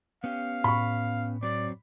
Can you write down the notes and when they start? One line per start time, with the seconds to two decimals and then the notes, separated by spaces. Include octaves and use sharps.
0.24 B3 C#4 G4 F5
0.64 A2 B5 C#6
1.43 F#3 C4 D5